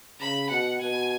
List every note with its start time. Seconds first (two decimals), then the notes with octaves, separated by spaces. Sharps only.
0.20 C#3 B5
0.50 B2 F#5
0.81 B2 G#5